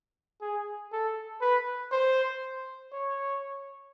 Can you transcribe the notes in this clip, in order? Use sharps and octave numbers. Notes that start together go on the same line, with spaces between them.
G#4
A4
B4
C5
C#5